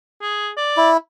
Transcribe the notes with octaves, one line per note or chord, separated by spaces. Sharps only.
G#4
D5
E4